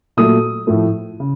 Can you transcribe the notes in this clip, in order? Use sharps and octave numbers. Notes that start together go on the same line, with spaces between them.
A#2 F#3 A3 D#6
A2 F3 A3
C#3